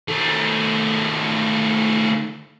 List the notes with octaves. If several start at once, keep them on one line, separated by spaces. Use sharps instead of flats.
D#3 A3